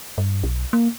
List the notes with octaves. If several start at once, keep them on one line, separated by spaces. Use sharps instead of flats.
G2
B1
A#3